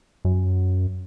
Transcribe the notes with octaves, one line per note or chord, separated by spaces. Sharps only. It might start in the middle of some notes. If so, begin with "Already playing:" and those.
F#2